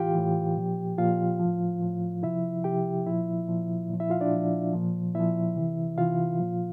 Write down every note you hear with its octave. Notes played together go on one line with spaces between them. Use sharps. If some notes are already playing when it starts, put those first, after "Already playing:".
Already playing: A2 E3 F4 G4 F5 G5
A2 E3
A#2 F3
A#2 F3 F4 F5
F3
A2
A2 F3
C3 F3 E4 E5
C3 F3 G4 G5
A#2 F3 E4 E5
A#2 F3
A#2 F3
E4 E5
F4 F5
D4 D5
A#2 F3
A#2 F3
A#2 F3 E4 E5
C3 E3
C3 E3 F4 F5
A#2 F3